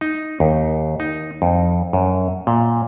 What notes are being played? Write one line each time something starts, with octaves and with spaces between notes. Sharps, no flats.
D#4
D#2
D#4
F2
F#2
A#2